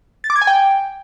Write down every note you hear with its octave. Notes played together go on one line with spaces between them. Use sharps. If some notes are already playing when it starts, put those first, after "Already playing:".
A6
D6
G#6
G#5
G5